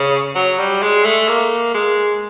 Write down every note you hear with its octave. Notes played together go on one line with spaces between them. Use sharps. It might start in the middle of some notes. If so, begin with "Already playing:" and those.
Already playing: C#3
F#3
G3
G#3
A3
A#3
G#3